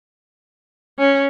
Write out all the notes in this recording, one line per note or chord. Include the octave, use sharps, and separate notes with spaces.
C#4